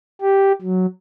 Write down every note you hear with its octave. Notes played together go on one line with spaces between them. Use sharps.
G4
F#3